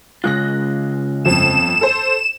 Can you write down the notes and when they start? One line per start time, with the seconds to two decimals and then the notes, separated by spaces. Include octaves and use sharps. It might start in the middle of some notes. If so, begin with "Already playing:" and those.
0.24 C#3 G#3 F4 F#6 A#6
1.25 G1 F2 F3 E7
1.81 A4 C5